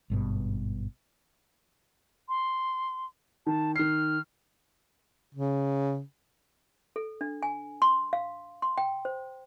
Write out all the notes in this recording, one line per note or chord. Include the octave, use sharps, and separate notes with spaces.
G#1 G2 B2
C6
D#3 A5
D#3 F6 C7
C#3
A4
D4
G#5
C6
F5
C6
G5
C5